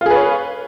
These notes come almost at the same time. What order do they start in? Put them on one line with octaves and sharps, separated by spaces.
F4 G#4 B4 C#5